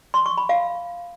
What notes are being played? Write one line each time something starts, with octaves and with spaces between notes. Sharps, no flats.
C6
C#6
B5
F5